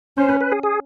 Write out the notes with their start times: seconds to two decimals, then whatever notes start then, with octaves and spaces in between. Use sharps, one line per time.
0.17 C#4 C5
0.29 B4
0.41 B4
0.52 G#4
0.63 G#4